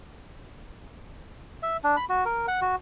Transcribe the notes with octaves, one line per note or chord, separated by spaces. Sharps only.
E5
D4
B5
F#4
A#4
F#5
F#4